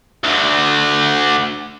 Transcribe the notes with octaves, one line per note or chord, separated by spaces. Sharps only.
D2 D3